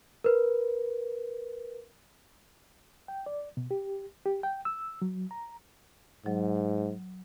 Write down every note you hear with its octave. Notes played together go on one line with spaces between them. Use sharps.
A#4 B4
G5
D5
B2
G4
G4
G5
E6
F#3
A#5
G#2 F#3